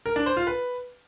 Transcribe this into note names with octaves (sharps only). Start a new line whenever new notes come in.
A#4
D4
C5
F4
B4